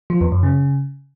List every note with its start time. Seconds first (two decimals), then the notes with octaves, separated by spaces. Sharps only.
0.10 F3
0.21 E2
0.32 F#2
0.43 C#3